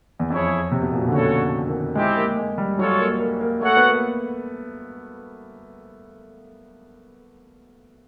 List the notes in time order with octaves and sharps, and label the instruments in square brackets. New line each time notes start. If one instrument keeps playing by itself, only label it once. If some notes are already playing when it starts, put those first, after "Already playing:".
[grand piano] E2
[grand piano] F2 [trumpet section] E4 G#4 C#5
[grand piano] C3
B2
A#2
B2
D3
[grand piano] C#3 [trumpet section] F#4 A4 C#5
[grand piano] D#3
[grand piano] G#3 [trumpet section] C4 E4 G4
[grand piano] A#3
G#3
G3
[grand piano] F#3 [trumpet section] F4 A4 C#5
[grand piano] A#3
A#3
A#3
[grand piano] A3 [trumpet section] F#4 A4 C#5 F#5
[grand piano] B3
A#3